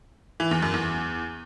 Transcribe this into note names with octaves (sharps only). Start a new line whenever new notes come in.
E3
E2
F#2
E2